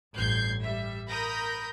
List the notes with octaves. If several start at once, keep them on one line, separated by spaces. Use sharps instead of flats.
A1 G2 G6 G#6 C7
G3 E5
A#4 A#5 B5 D#6 G6 A#6